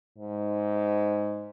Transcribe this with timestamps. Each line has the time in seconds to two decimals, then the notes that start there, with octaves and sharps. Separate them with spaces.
0.18 G#2